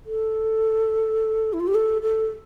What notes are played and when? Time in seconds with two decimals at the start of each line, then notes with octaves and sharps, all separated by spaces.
0.06 A4
1.53 E4
1.60 F4
1.67 G4
1.75 A4
2.02 A4